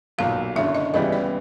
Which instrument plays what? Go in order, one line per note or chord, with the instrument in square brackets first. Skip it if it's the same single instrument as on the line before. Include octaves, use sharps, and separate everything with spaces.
[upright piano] B1 A#2 F#3 [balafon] F5
[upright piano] F#1 F#2 D3 [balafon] E5
[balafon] D#5
[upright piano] C#2 C#3 E3 G3 B3 [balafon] D#5
[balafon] D5